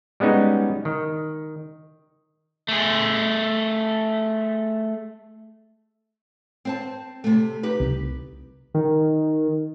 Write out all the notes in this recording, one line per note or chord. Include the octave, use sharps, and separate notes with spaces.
G3 G#3 B3 C#4 D#4
D#3
A3 G#4
C4 C5 A5
C3 A3
D#4 G4 B4
C2
D#3